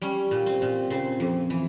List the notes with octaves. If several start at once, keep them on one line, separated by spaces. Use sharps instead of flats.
G3 C#4
A#2
C4
A#2
C#3 C4
F2
E3